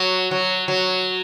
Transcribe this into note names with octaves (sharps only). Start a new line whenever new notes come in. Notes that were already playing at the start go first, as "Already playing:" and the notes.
Already playing: F#3
F#3
F#3